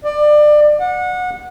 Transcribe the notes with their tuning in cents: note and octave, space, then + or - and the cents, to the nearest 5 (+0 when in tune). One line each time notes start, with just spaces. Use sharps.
D5 +25
F#5 -25